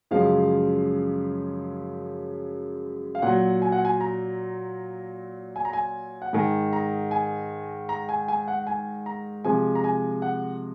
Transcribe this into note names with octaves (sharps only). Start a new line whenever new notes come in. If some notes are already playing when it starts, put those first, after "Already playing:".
F#2 C#3 F3 G#3 F5
F5
A#2 F#3 F#5
G#5
F#5
G#5
A#5
G#5
A#5
G#5
F#5
G#2 D#3 G#3 G#5
A#5
G#5
A#5
G#5
G#5
F#5
G#5
A#5
C3 F3 G#3 G#5
A#5
G#5
F#5